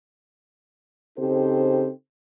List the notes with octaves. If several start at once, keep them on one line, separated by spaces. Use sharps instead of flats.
C#3 C4 D#4 G4 A4 C5